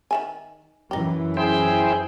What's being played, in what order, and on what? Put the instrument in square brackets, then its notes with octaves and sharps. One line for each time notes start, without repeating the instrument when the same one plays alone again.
[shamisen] D#3 E5 G#5
[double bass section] F#2 E3 [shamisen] D#4 G4
[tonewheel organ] E4 C5 G5 [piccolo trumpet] G#4